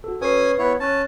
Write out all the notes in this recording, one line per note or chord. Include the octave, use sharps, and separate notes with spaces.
F#4 A4
C#4 B4 G#5 C#6 D#6 C7
B3 E4 C#5
C#4 A5 F#6 A6